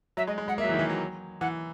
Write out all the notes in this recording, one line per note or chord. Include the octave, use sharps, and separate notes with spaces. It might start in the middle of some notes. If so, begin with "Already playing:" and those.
F#3 E5
G#3 D#5
G#3
G#3 F#5
A#3 E5
F#3
E3
D#3
E3
F#3
E3 F#5